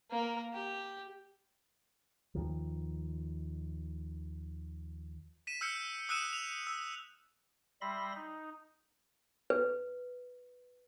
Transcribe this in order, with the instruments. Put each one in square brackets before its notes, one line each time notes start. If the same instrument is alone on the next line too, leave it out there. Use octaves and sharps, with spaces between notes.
[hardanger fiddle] A#3 A#4
G4
[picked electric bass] D#2 D#3 F3
[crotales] B6 D#7 E7
E6 F6 G6 C#7
D#6 E6 F#6 C#7 D#7 E7
F7
E6
[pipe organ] G3 E5 B5 C6 A#6
D#4
[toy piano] B4